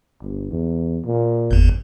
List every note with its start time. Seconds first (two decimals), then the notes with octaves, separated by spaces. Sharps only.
0.22 G1
0.51 E2
1.05 A#2
1.51 G1 E2